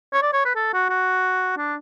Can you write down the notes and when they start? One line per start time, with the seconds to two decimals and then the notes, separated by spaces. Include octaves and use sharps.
0.14 C#5
0.22 D5
0.34 C#5
0.45 B4
0.56 A4
0.74 F#4
0.90 F#4
1.57 D4